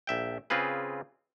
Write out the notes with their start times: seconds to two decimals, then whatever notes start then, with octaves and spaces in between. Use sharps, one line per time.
0.07 A#1 E5 G5
0.50 C#3 C4 F4 G#4 B4